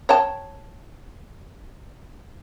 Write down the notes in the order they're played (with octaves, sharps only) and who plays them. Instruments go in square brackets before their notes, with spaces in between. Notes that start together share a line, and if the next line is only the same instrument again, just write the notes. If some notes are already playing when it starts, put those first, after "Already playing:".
[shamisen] C#5 G5 A5